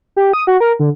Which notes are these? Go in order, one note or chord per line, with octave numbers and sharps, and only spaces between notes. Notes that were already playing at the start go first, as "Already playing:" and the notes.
G4
D#6
F#4
A#4
D3